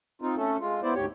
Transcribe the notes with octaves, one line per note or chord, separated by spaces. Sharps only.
C4 D#4 F4
A3 C#4 A4
G#3 F4
B3 E4 C5 D5
D2 G#2 G4 C#5